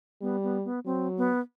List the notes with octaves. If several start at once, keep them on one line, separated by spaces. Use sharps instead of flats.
G3 B3
B3
B3
F#3 C4
B3